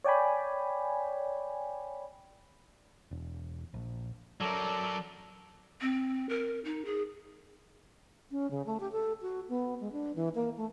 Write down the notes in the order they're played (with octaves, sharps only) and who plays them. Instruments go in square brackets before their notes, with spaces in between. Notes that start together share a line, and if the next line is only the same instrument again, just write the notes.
[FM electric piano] C#5 D5 G5 G#5 B5
[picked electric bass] E1
A#1
[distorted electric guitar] F#3 A#4 [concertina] A4 D5
[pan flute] C4
A#4
D#4
G#4
[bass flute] C#4
C#3
A3
G4
A4
F#4
B3
G#3
D4
E3
A#3
A3